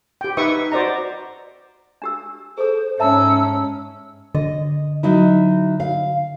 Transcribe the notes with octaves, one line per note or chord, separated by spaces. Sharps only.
G4 G5
D#4 B4 E5 C#6 D#6
F#4 C5 D5 D#5 A#5
D4 G4 E6
G#4 A4 C5
G#2 C#4 E5 A5 A#5 E6
D3 D#5
F#3 D#4 E4
F5